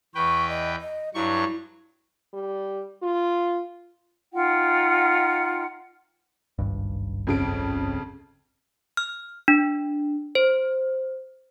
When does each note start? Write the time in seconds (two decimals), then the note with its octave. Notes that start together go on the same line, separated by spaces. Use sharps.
0.15 E2 B4 G5 C#6
0.49 D#5
0.81 D#5
1.15 G2 F#3 E4 C#6
2.33 G3
3.02 F4
4.32 D#4 F4 F#5 G5
6.59 G#1 C#2 G2
7.27 F2 C#3 D7
8.97 F6
9.48 D4
10.35 C5